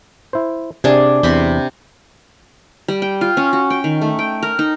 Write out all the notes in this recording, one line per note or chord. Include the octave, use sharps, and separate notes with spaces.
E4 C5
C3 D4 G#4
E2 C3 B5 C6
G3
G5
F4
C#4
F#4
G5
D#3
A3
G5
A#4
D#4